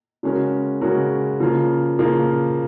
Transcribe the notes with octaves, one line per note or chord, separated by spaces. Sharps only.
C#3 G#3 C#4 F#4 A#4
C#3 G#3 C#4 F#4 A#4
C#3 F3 A#3 F4
C#3 F3 A#3 F4